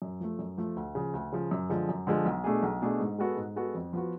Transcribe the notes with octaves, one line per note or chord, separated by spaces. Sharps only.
F#2
F3 A3
F#2
F3 A3
D2
C#3 F3
D2
C#3 F3
F#2
D3 F3 G#3
F#2
D3 F3 G#3
B1
B2 A3 D4 G#4
B1
B2 A3 D4 G#4
G#2
G#3 B3 F#4 A4
G#2
G#3 B3 F#4 A4
F2
F3 B3 F#4